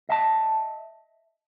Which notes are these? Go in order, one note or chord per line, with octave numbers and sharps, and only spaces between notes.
D#5 E5 A5